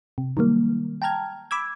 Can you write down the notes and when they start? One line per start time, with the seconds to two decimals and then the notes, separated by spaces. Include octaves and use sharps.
0.18 C3
0.37 D#3 F#3 G3 A#3
1.02 G5 A5 A#5 F6 G#6
1.51 B5 D6 E6 G#6